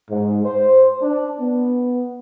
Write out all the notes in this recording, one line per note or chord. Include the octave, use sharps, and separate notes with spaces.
G#2
C5
D4
B3